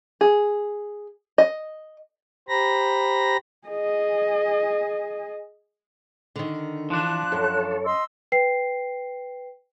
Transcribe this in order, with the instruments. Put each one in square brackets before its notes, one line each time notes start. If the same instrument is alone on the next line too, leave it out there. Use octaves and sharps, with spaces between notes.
[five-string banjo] G#4
D#5
[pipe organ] G4 C5 A#5 B5 A#6
[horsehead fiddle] G#4 D#5
[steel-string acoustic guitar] D3 D#3
[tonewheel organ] E3 [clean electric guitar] F3 D4 [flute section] F#6
[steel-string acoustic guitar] F#2 [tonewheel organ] A4 C#5
[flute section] D#5 C6 E6
[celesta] B4 G5 C7